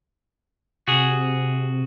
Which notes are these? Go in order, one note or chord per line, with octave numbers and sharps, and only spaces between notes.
C3 F#4 G#4